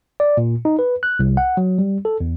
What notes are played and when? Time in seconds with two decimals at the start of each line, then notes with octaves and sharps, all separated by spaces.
0.20 D5
0.37 A#2
0.65 D#4
0.79 B4
1.03 F#6
1.19 C2
1.37 F#5
1.57 F#3
1.79 G3
2.05 A4
2.20 E2